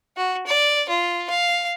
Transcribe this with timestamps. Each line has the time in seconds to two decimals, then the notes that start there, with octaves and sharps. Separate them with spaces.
0.17 F#4
0.47 D5
0.89 F4
1.30 F5